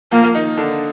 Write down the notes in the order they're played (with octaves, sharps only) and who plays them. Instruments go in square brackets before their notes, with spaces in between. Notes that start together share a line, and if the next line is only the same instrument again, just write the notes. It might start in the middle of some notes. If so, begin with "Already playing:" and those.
[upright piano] F3 F4 [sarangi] A#3
[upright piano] D#3 D#4
D3 D4